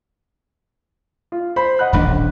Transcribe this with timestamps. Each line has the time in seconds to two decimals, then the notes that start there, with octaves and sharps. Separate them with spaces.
1.32 F4
1.56 C5 B5
1.79 D#5 F#5 F#6
1.93 D#1 A1 D4 B5